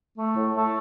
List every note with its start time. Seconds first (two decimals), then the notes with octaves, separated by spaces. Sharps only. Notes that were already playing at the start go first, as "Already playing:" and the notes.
0.17 A3
0.35 A2
0.54 A3